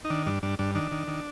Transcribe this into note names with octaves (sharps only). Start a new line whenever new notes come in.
D#4
D#3 D4
G2 D4
G2 D4
G2 D4
D#3 D4
D#3
D#3